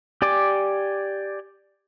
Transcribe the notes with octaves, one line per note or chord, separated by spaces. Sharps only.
G4 D5 G#5 D6